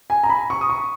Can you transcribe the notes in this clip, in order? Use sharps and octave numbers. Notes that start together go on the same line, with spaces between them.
G#5
A#5
B5
C#6
D#6
C#6